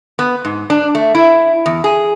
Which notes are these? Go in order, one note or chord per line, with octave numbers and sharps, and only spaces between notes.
B3
G#2
D4
A3
E4
E2
G#4